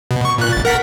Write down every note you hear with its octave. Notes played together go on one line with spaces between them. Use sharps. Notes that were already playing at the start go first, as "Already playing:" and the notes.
B2
C#6
A#2 F#6
G#1 A6
A#4 F#5 B6